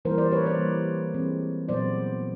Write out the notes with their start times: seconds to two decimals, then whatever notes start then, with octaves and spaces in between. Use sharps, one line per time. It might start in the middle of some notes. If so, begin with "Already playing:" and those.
0.05 E3 G3 A#3 A#4 C5
0.18 C5 D5
0.32 B4 C#5
0.46 C5 D5
0.59 E3 G3 A#3
1.14 E3 G#3 C4
1.68 A#2 F#3 B3 C5 D5